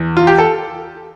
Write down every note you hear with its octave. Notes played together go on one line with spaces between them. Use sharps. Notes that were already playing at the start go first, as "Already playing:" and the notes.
Already playing: E2 E3
F4
G4
A4